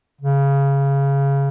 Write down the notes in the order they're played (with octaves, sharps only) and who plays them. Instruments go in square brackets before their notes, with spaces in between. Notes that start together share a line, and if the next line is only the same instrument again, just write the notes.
[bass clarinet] C#3